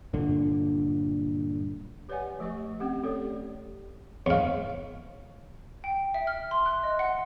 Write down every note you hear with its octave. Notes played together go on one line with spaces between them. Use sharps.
G2 A#2 D3
G4 B4 C#5 D5 F#5 G#5
F3 A3 G4 D#5 C#6
A3 C4 C#4 G4 F#5
A3 C#4 G4 A4 C#5 D5
D5
E2 G#2 C#5 F5
G5
E5
F6
C6
F#6
D#5
F#5